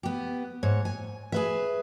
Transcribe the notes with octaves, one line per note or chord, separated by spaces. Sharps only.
B3 G4
G#2 C#5
G#5
G#4 B4 E5